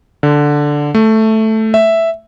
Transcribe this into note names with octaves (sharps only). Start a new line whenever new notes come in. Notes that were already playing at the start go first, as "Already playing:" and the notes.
D3
A3
E5